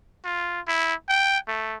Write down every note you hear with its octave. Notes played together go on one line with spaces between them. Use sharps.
F4
E4
G5
A3